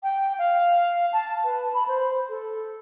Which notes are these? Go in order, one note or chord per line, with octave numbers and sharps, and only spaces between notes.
G5
F5
A5
B4
B5
C5
A4